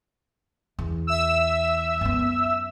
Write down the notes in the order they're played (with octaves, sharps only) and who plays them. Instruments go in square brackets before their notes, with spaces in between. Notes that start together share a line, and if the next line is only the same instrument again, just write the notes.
[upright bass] E2
[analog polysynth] E5 E6
[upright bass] F#2 B3